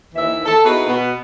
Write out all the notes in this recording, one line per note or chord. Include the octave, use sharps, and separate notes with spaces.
D#2 E3 E5
A4
B3 D#4 E4 F#4 G#4 B4
B2 B3